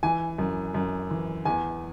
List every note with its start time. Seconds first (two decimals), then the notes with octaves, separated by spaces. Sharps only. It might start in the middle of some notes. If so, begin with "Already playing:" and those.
0.03 E3 G#5
0.38 F#2
0.74 F#2
1.11 E3
1.45 E2 G#5